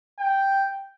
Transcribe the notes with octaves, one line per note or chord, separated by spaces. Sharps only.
G5